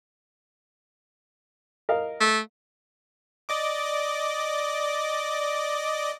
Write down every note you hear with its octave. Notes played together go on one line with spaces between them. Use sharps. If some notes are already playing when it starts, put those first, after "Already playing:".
A#4 D#5 F5
A3
D5 D#5 D6